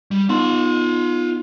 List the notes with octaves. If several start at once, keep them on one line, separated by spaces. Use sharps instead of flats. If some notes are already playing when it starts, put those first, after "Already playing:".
G3
B3 D#4 F4 F#5 C6